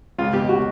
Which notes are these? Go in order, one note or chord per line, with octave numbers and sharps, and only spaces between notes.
C#2 F4
B2 G4
B2 F#4